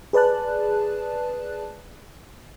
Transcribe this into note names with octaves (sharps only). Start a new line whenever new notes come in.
G#4 B4 D5 A5 F#6